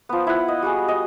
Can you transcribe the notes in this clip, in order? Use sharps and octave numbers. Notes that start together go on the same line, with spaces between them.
F3 B3
E4 F#5
D#5
G3 F#4 G#4
D#5